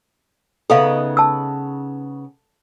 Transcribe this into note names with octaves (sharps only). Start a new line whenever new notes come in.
C#3 B3 D#4 A4 E5 F5
A5 E6